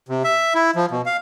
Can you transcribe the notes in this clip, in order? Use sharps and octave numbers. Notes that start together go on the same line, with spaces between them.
C3
E5
E4
F3
B2
F5